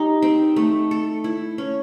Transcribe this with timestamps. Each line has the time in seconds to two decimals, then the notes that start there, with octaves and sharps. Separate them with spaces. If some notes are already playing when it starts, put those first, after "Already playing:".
Already playing: D#4 G4
0.22 C4
0.56 A3
0.91 A4
1.24 E4
1.58 C#4